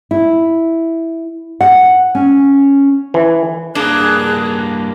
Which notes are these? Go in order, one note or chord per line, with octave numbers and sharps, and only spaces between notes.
E4
F#5
C#4
E3
G2 A#3 D4 G#4 F#6